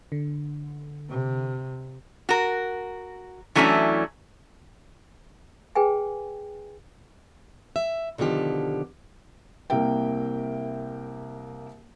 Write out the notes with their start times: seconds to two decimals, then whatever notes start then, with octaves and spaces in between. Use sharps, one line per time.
0.12 D3
1.10 C3
2.29 F#4 A#4
3.55 E3 F#3 A3 C#4 D4 E4
5.75 G#4 B4 G5 G#5
7.76 E5
8.18 B2 D3 D#3 F3 G4
9.70 C2 A#3 A#4 E5 G5